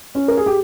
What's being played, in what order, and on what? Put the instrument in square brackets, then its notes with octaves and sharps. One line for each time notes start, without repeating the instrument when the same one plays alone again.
[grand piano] C#4
A#4
G#4
G4